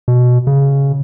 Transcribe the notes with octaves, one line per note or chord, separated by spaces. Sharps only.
B2
C#3